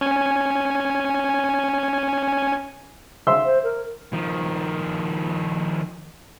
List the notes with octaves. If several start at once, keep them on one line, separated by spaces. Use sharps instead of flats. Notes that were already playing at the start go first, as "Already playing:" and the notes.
C#4 G#5
E5 C6 E6
C5
A#4
D#3 F3